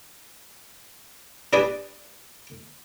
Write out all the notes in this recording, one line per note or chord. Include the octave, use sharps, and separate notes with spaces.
D4 G4 G#4 B4 D5 G#5